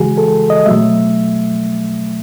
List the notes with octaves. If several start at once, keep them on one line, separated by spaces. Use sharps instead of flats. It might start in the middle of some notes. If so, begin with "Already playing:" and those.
Already playing: C#3 E3 G#3 F#4 G#4
A4
D#5
B2 F#3 A3 E5